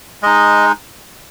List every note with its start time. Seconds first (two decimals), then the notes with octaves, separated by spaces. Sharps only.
0.22 G#3 D#4 D#5